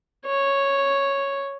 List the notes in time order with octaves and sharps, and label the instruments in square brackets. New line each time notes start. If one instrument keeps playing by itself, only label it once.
[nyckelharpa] C#5